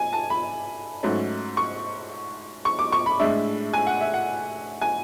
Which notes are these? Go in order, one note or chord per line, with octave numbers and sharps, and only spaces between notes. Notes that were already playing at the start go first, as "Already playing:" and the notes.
Already playing: G#5
A5
B5
G#2 F#3 A3 C#4
C#6
C#6
D6
C#6
B5
A2 G#3 D4 E5
G#5
F#5
E5
F#5
G#5